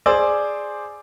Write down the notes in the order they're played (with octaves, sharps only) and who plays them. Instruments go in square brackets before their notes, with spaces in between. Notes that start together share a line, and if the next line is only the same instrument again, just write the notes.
[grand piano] G#4 C5 D5 G#5 D6 E6